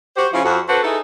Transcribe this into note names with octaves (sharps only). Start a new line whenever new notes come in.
F#4 G4 C5
C#3 F3 C#4 E4 F4
F2 F#4
D4 F#4 A4 B4 C5
D#4 E4 G#4 A4